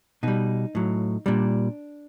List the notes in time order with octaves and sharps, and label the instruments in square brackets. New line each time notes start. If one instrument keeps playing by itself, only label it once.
[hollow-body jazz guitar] B2 G3 D#4
A2 F#3
A#2 G3 D4